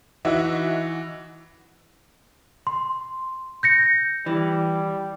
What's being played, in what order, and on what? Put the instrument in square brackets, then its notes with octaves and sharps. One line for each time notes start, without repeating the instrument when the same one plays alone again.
[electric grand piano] E3 [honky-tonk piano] D#4 F#4 E5
[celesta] C6
G6 A#6 C#7
[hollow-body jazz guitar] E3 [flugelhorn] G3